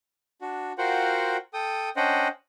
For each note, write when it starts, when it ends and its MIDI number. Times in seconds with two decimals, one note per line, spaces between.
0.41 0.73 62
0.41 0.73 66
0.78 1.37 65
0.78 1.37 66
0.78 1.37 70
0.78 1.37 72
0.78 1.37 78
0.78 1.37 79
1.53 1.90 69
1.53 1.90 79
1.53 1.90 87
1.96 2.28 61
1.96 2.28 62
1.96 2.28 72
1.96 2.28 75
1.96 2.28 78
1.96 2.28 79